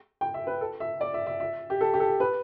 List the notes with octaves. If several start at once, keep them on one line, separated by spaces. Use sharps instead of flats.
G5
E5
B4
A4
E5
D5
E5
E5
E5
G4
A4
G4
A4
B4